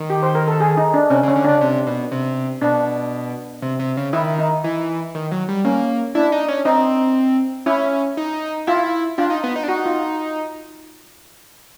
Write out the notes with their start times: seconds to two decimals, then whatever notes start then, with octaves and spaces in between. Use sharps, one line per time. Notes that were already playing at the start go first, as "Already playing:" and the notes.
Already playing: D#3
0.10 G4
0.23 C5
0.35 A#4
0.48 A4
0.60 G#4
0.77 D#4
0.94 D4
1.10 C3 C#4
1.23 C#3
1.28 C#4
1.36 D3
1.45 C#3 D4
1.61 C3
1.87 B2
2.12 C3
2.62 B2 D4
3.62 C3
3.79 C3
3.97 C#3
4.13 D#3 E4
4.38 D#4
4.64 E3
5.15 D#3
5.32 F#3
5.48 G3
5.65 A#3 C#4
6.15 D4 E4
6.32 D#4
6.48 C#4
6.65 C4 D#4
7.66 C#4 E4
8.17 D#4
8.67 E4 F4
9.18 D4 F4
9.30 D#4
9.44 B3
9.56 D#4
9.63 D4
9.68 D#4 F#4
9.85 F4